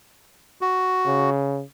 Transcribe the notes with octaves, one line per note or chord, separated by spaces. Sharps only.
F#4
C#3